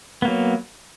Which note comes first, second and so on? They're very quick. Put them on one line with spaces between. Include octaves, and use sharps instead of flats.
B3 A#3 F#3